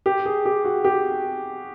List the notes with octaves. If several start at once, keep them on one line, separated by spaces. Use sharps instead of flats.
G4
G#4
G4
F#4
G4